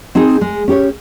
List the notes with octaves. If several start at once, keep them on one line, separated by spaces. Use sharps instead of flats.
C4 D#4 G#4
G#3
C#4 G4 C#5